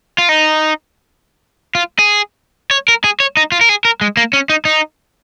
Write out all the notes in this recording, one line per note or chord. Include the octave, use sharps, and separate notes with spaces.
F4
D#4
F4
G#4
C#5
A#4
G#4
C#5
D#4
F4
A#4
G#4
A#4
G#3
A#3
C#4
D#4
D#4